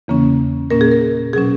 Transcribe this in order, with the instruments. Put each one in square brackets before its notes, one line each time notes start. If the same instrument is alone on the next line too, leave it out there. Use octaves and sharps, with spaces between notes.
[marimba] E2 C#3 E3 A#3 C#4
A#2 A#3 C#4 A#4
G#4
A#4
B2 F#3 C#4 G#4